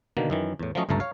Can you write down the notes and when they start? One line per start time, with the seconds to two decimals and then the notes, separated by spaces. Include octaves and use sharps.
0.17 B2 D3 D#3 A#3
0.30 F#2 D#3 E3
0.59 E2 A2
0.75 F3 F#3 A3 C#4 D#5
0.89 G1 C#2 G2 A3 A5 A#5
1.00 C#5 F5